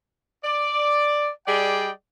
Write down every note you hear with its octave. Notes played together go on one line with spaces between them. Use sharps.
D5
G3 G#4 D5 D#5 G5